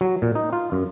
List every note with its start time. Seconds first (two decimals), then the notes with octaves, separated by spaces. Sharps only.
0.01 F#3
0.22 A#2
0.35 D#4
0.53 F4
0.72 F#2